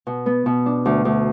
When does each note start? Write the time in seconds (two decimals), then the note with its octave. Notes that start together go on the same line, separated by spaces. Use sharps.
0.07 B2
0.26 B3
0.46 B2
0.66 D4
0.86 D2
1.05 D2